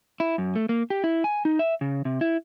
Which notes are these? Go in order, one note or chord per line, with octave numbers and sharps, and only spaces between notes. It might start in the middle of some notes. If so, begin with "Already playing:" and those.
E4
F#2
A3
A#3
G4
E4
G#5
D#4
E5
C#3
C3
E4